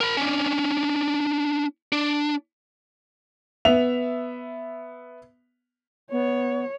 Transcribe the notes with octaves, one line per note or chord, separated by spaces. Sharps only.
A#4 B5
C#4 D4
D4
B3 E5 F7
B3 C#5